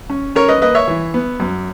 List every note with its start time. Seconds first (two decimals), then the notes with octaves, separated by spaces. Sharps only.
0.10 C#4
0.36 C#4 A#4 C#5
0.48 B4 D#5
0.61 A#3 B4 D#5
0.75 C#5 E5
0.88 E3
1.14 B3
1.40 F#2